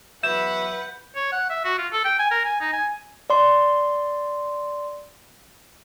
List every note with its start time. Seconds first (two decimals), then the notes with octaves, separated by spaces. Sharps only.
0.23 E2 F#3 B4 E5 F#5 G6 E7
1.16 C#5
1.32 F#5
1.50 E5
1.65 F#4
1.78 F4
1.93 A4
2.05 G5
2.19 G#5
2.31 A#4
2.45 G#5
2.61 D#4
2.73 G#5
3.30 D5 C6